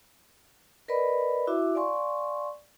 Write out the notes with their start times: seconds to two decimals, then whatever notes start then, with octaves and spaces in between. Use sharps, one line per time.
0.88 A#4 B4 D5 D#5 B5
1.47 E4 F#4 E5 D6
1.75 D5 F5 G#5 C6 C#6